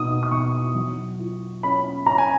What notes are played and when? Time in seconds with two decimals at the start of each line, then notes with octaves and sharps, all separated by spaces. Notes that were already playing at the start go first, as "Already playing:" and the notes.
Already playing: B2 D#4 D#6
0.23 D#6
0.31 B2 C#6
0.75 F#3
1.19 F4
1.63 C#4 B5
2.06 C#4 A#5
2.18 G#5